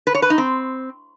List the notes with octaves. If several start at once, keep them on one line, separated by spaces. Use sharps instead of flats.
B4
C#5
B4
D#4
C4